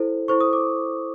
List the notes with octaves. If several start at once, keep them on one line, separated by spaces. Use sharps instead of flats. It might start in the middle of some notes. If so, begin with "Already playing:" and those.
Already playing: E4 A4 C5
E4 A4 C5 C#6
D#6
D6